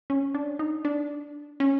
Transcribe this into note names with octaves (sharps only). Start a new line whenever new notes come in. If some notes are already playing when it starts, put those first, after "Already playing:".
C#4
D4
D#4
D4
C#4